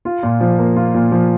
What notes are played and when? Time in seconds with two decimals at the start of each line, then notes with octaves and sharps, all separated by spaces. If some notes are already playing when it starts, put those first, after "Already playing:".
0.05 F4
0.23 A#2
0.40 F3
0.59 A#3
0.76 F4
0.94 A#2
1.12 F3